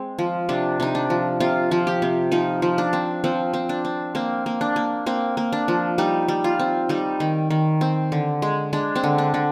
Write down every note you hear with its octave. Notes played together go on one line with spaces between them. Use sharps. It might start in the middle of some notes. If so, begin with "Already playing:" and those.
Already playing: G#3 C4
F3
C3 D4
C3 D#4
D4
F3
C3 F4
F3
G4
C3
F3 D#4
F3
D4
C4
F3 C4
C4
D4
C4
A#3 C4
A#3
D4
A#3
A#3 C4
A#3
D4
F3
G3 D#4
G3
F4
C4
G3 D#4
D#3
D#3
C4
D3
G#3
G#3 D4
C4
D3
D4
D3